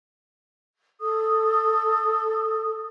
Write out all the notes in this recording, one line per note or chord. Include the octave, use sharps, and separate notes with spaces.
A4 D#6